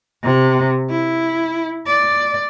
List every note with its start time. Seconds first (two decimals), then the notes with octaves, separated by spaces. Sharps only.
0.23 C3
0.90 E4
1.87 D5